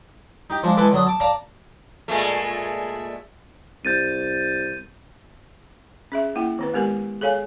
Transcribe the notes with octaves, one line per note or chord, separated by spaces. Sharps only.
D#4 G4
F3 G#3 D4
E3 G#3 A4 B4 D6
D3 F#3 D#6
A5 D6
D5 F5 A5 A#5
A#2 G#3 A3
C2 G6 A6 D#7
C#4 G#4 E5
A#3 E4 F#5 G5
D#3 C4 B4
G#3 B3 G4 A#4 G#5
G#4 A4 C#5 F5 G#5